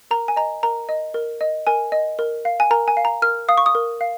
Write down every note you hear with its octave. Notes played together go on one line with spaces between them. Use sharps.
A#4 A#5
G#5
D#5 A#5
A#4 A#5
D#5
A#4
D#5
A#4 G#5
D#5
A#4
F5
G#5
A#4 A#5
G#5
F5
A#5
A#4 F6
F5 D#6
C#6
D#6
A#4
F5